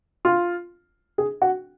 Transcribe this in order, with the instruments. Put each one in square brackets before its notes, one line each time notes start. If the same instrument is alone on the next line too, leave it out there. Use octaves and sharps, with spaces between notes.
[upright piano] F4
G#4
F#4